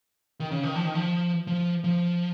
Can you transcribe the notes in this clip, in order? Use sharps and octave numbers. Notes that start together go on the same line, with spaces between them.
D#3
C#3
D#3
F3
D#3
F3
F3
F3